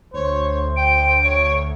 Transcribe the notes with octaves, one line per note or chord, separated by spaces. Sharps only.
D2 C5 C#5
G5 D7
C#5